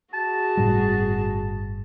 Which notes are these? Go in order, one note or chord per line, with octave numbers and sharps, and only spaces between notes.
F#4 G#4 A5
G1 A2 G3